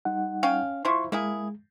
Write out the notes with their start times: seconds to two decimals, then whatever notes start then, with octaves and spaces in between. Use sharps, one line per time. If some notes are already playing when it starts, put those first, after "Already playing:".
0.05 G3 D#4 F#5
0.43 C#4 F5 G5
0.85 F3 E4 C6 C#6
1.12 G#3 A#3 E4 G#4